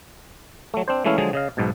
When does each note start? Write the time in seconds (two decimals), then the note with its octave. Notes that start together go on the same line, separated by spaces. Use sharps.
0.74 F#3 A3
0.88 C4 D4 C5
1.05 E3 G#3 A3 C#4 E4 F5
1.18 D3 F3 F#3 G#3 G#4
1.33 C#3 D#5 F5
1.57 B1 G#2 B2